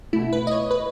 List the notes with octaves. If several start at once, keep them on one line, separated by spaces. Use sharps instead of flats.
B2 A3 E4
B4
D#5
C#5
B4